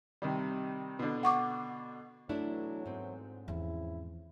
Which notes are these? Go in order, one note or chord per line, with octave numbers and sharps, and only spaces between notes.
C3 D#3 G3
B2 D3
F#5 C#6 D6
B2 E3 F#3 A3 D4 E4
G#2 C4
E2 C#3 F3 E4